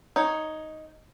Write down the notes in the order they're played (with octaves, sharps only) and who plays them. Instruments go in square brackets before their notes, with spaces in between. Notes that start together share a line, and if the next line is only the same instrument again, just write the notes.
[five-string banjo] D#4 C#5